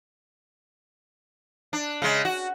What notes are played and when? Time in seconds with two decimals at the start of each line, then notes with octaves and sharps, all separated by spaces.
1.73 D4
2.02 C#3 G#3
2.25 F#4